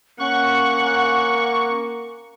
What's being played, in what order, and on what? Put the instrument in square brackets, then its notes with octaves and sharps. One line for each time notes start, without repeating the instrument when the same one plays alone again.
[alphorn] A#3 [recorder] C#4 [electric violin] F#5 [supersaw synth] C#6